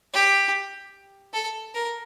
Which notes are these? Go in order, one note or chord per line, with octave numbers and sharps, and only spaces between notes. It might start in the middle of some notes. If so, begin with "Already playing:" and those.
G4
A4
A#4